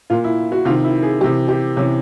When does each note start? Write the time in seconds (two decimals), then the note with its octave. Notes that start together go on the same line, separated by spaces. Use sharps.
0.10 A#2 F4
0.24 E4
0.52 F#4
0.65 C3 F4
0.69 D#3
0.84 E4
1.03 G#4
1.21 C3 E3 G4
1.48 G4
1.77 C3 E3 C#4